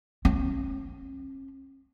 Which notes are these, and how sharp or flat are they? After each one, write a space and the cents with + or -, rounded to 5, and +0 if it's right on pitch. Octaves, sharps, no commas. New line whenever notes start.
C#4 -45